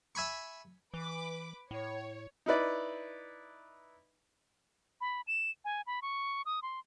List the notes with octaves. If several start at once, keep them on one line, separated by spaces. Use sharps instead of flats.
E5 G#5 B5 C#6
E3 B4 D6
A2 C#5
D#4 E4 B4 D5
B5
E7
G#5
B5
C#6
D#6
C6